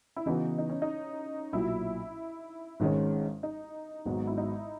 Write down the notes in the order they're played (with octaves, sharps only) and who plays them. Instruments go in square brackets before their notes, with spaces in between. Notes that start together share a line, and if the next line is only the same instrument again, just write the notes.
[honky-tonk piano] E4
[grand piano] C#3 E3 B3 F#4 B4 [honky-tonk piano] D#4
[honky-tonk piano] D#4
C#4
D#4
[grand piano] B1 A#2 F#3 [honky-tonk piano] E4
[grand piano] G#1 G#2 D#3 G#3 C#4
[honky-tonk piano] D#4
[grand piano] G#1 G#2 F#3 B3 F#4 [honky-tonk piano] D#4
[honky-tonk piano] E4
D#4